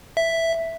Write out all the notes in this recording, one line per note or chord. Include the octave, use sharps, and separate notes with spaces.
E5